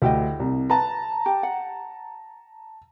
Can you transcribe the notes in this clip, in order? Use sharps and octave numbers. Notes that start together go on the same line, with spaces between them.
D2 E4 G4 D#5
C2
B4 A5 A#5
G4
F#5